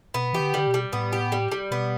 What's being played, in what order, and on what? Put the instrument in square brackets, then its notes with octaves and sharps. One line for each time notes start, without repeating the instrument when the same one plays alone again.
[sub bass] B2 [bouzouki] B3
[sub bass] E3 [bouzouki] G4
[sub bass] D3
[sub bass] D3 [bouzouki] G3
[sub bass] B2
[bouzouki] G3
[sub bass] A2 [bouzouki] B3
[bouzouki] G4
G3
G3
[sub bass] B2 [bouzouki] B3